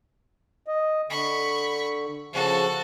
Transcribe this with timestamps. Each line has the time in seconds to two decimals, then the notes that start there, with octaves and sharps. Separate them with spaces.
0.67 D#5
1.10 D3 B5 C#6
2.33 C#3 F3 F#4 A4